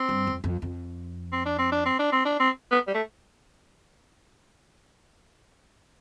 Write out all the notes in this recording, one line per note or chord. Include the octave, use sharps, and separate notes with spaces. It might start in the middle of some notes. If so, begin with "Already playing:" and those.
Already playing: C4
G2
F2
F2
F2
C4
D4
C4
D4
C4
D4
C4
D4
C4
B3
G3
A3